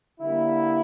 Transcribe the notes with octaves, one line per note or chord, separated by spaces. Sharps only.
D3 G3 A#3 E4